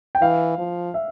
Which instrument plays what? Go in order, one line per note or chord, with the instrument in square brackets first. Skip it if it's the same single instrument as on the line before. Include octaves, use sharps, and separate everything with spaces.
[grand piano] G5
[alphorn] E3 [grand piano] F5
[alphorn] F3
[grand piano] E5